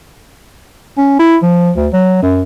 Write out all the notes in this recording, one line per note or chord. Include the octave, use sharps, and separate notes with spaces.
C#4
E4
F3
D2
F#3
F#2